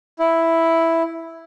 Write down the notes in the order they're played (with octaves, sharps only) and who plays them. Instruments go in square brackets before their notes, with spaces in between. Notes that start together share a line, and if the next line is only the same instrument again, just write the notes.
[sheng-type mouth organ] E4